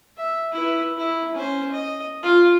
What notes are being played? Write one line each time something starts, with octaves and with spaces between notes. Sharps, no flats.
E5
E4 B4
E4
C#4 C5
D#5
F4